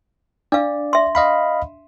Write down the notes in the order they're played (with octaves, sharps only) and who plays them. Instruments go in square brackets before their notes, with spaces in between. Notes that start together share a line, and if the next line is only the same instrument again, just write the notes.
[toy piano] D4 F5 [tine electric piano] D5
[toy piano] E5 C6
[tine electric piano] D#5 F5 B5